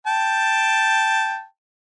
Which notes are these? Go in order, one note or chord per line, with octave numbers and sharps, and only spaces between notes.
G5 A5